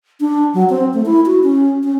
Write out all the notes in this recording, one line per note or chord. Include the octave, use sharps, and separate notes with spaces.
D4
F#3
C4
A3
E4
F#4
C#4
C#4